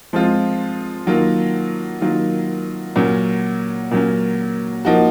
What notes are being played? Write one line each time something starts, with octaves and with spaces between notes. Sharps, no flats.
F3 G#3 C4 F4
D#3 F#3 A#3 F4
D#3 F#3 A#3 F4
A#2 F#3 C#4
A#2 F#3 C#4
F3 A#3 D#4 F#4